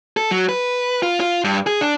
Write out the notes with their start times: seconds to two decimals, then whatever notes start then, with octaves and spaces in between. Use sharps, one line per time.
0.17 A4
0.31 F#3
0.49 B4
1.02 F4
1.20 F4
1.44 G2
1.67 G#4
1.81 D4